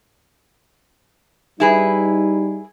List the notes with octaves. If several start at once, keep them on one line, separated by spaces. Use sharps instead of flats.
G3 D#4 E4 G#4 B4